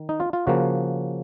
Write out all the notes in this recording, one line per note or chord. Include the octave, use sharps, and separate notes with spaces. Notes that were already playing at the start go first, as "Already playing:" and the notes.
Already playing: D#3
D#4
F4
F4
C#3 F3 A#3 F#4